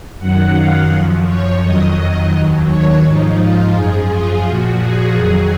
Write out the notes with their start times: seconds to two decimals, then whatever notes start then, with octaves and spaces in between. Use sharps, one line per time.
0.19 F#2 D#3 F#3 F#5
0.55 F5
0.90 F#2 F3
1.25 C#5
1.61 F2 D#3 F#3 D#5
1.96 D#5
2.32 D#2 D#3 F#3
2.67 C#5
3.03 G#2 F3 D#4
3.38 F4
3.74 F#2 F3 G#4
4.09 F4
4.45 A#2 F3 F#4
4.80 G#4
5.16 F2 D#3 F#3